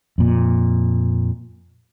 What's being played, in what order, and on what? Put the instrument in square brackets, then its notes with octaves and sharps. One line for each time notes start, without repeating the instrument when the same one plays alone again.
[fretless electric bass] F2 A#2